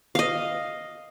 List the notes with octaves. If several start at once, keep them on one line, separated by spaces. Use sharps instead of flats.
D#5 F5